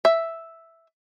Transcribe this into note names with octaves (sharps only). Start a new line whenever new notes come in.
E5